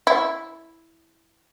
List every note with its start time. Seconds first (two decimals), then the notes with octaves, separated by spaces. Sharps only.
0.07 E4